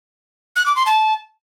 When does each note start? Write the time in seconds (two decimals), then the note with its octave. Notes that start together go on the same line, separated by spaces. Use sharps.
0.56 F#6
0.66 D6
0.76 C6
0.86 A5